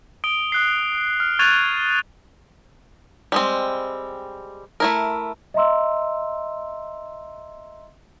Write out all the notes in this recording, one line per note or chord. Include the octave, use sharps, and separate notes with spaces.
D#6 D7 G7
D#6 F#6 C7
F6
C#6 F#6 G#6 A6 D#7 F7
G3 G#3 C4
A3 E4 A#4
D#5 E5 A#5 C6 E6